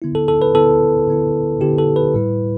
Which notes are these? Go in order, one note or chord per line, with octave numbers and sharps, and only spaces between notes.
D3 B3 E4
A4
A4
B4
D3 B3 E4 A4
D3 B3 E4
D3 B3 E4 G4
A4
B4
A2 G3 E4